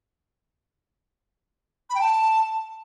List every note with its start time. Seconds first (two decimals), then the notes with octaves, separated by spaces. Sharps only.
1.89 B5
1.95 G5
2.00 A5